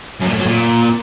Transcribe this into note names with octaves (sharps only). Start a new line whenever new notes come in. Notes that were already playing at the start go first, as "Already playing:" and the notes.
F#2
A#2
A2
F#3
A#2